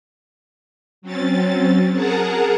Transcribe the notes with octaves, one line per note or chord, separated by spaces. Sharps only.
F#3 C4 C#4 A6
G#4 A#4 F#5 A5 A#5